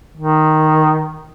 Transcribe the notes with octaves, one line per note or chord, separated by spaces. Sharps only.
D#3